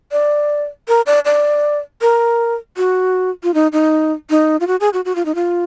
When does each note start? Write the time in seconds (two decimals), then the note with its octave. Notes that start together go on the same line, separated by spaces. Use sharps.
0.12 D5
0.88 A#4
1.06 D5
1.25 D5
2.01 A#4
2.77 F#4
3.43 F4
3.54 D#4
3.73 D#4
4.30 D#4
4.60 F4
4.67 F#4
4.80 G#4
4.93 F#4
5.05 F#4
5.16 F4
5.25 D#4
5.35 F4